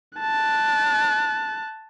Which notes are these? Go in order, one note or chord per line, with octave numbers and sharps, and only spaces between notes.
A5 F#6